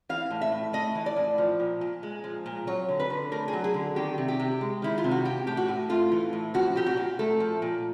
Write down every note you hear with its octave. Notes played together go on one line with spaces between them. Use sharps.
E3 F5
A2
E5
A2
A3 D#5
E3
D5
A2
F3
A#2
A#2
G#3
F3
A#2
F#3 C#5
D3
B4
D3
A3 A#4
G#4
F#3
G#4
D3
D#3 G4
C3
G4
C3
G#3
D#3 E4
F4
C3
F#4
E3 G4
A2 G4
F#4
A2
A3 F4
E3
A2
F3 F#4
A#2 G4
F#4
A#2
A3 A4
F3
A#2